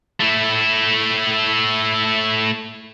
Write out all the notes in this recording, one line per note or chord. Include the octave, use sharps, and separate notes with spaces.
A3 E4